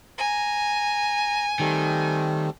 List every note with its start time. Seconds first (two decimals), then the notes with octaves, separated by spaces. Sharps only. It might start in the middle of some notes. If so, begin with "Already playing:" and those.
0.18 G#5 A#5
1.60 D#3 G3 A3 C4